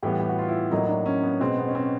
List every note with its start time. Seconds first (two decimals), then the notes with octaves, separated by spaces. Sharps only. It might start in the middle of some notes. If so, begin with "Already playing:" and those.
0.03 A2 E3 G3 B3 G4
0.19 G4
0.29 F#4
0.39 F4
0.48 E4
0.71 A2 F#3 A#3 D#4
0.84 D#4
0.89 D4
1.06 C#4
1.23 B3
1.40 B2 G#3 B3 C4
1.58 B3
1.68 C#4
1.75 C4